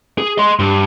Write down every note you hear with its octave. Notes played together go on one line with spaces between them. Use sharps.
G#4
D#5 C6
G2